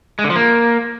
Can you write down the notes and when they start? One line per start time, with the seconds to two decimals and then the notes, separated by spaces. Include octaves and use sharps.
0.19 G#3
0.24 D3
0.30 F3
0.36 A#3